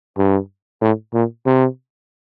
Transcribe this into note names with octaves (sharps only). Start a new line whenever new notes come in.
G2
A2
A#2
C3